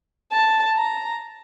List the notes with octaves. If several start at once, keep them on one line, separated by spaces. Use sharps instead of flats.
A5
A#5